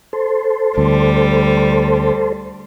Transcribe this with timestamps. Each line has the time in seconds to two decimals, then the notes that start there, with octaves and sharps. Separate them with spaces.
0.13 A4 C5
0.78 D2 G3